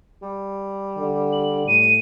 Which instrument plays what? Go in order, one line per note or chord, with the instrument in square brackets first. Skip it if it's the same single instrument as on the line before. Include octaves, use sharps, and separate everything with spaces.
[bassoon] G3
[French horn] D3
[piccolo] F#7
[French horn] A2 [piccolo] D#7